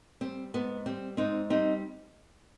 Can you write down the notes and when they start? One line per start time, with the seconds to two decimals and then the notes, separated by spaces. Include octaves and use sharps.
0.21 G3 C4
0.54 G#2 B3
0.86 G3 C4
1.17 G#2 C4 D#4
1.50 G3 C4 D#4